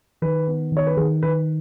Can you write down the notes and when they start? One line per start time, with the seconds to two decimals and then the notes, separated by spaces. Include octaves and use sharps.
0.22 D#3 B4
0.47 B3
0.72 D#3
0.77 C#5
0.87 B4
0.97 D#3 G#4
1.23 D#3 B4